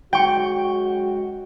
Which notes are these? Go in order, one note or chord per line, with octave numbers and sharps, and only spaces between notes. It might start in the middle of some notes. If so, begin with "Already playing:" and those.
F#2 G#3 F#4 G5 C#6